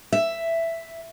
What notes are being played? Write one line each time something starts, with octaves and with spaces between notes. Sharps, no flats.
E5